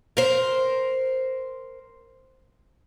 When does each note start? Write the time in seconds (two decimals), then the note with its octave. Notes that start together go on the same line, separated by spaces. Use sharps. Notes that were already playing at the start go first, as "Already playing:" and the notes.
0.17 A#4 C5